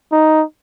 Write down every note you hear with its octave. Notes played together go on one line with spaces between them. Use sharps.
D#4